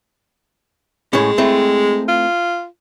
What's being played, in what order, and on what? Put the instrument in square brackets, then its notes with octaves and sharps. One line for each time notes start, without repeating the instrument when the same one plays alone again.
[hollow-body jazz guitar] A2 C#4 [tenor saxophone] G#3
[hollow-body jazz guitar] A3 C4 E4
[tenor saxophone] F4